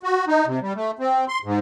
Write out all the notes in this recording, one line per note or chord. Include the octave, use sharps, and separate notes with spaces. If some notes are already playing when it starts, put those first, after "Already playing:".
F#4
D#4
C3
G3
A3
C4
C6
G#2